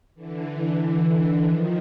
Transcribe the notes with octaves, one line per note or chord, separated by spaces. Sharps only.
D3 E3
D#3 F3